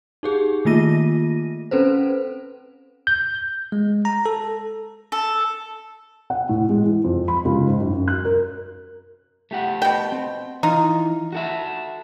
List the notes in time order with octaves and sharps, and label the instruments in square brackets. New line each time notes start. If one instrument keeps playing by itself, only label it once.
[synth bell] D#4 G4 G#4
D#3 A3 A#3 F4 A#6 D#7
C4 C#4 A4 B4 C5
[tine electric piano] G6
G#3
A#5
A4
[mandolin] A4
[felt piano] F#5
A2
G#3
E3
F2
B5
C#2
G#2
F#2
F#2
F#6
A#4
[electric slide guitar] A3 G4 F#5
[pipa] B2 G5
[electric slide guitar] C4
[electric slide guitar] E3 [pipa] D#4 F4
[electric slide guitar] F#4 A4 E5